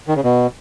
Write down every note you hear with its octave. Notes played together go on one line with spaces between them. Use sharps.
D#3
C#3
B2